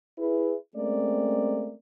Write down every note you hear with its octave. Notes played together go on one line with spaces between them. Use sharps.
E4 G#4 B4
G#3 A3 C4 C#4 A#4 D5